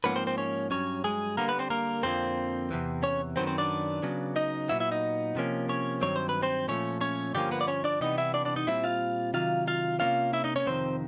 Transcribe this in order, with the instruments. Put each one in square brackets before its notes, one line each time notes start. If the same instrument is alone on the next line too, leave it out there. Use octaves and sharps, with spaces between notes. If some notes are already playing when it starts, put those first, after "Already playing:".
[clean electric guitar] G#2 F3 A#3 B3 C#4 B4
C4 C5
C4 C5
C#4 C#5
G2 D#3 F#3 C#4 C#5
G#3 G#4
D3 G3 A#3 B3 A#4
B3 B4
C4 C5
A#3 A#4
F2 D3 F3 A#3 C4 C5
E2 C3 E3
C#4 C#5
F#2 D#3 F#3 B3 C4 C5
C4 C5
D4 D5
C#3 F#3 B3
D#4 D#5
A#2 F#3 B3 E4 E5
E4 E5
D#4 D#5
C3 F3 A#3 C#4
C#4 C#5
G2 D#3 F#3 C4 C#5
C5
B4
C4 C5
A#2 F3 A3 C#4 C#5
C#4 C#5
G2 D3 F3 G3 A#3 C#4 G4
B3 B4
D5
C#4 C#5
D4 D5
C3 E3 G3 B3 D#4 D#5
E4 E5
D4 D5
D4 D5
D#4 D#5
A#2 G3 C4 E4 E5
F4 F5
C3 D#3 F#3 F4 F5
F4 F5
C3 F3 A#3 C#4 F4 F5
E4 E5
D#4 D#5
C#4 C#5
F2 C3 D#3 C4 C5